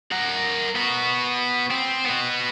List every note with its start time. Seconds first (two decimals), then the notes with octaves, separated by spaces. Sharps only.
0.12 A#4 F#5
0.76 B3 F#4
1.71 C4
2.05 B3 F#4